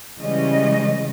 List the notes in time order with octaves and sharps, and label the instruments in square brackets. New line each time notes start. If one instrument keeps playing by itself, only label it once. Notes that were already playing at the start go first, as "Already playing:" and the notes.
[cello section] C#3 E3 G3 G#3 C#4 D#5